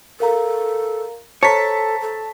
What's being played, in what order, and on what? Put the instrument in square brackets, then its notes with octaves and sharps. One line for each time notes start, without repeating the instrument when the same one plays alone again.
[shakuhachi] A4 [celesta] A#4 F5 A#5
[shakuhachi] A4 [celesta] C5 A#5 [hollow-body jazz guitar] C#5 [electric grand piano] A5 B6
[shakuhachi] A4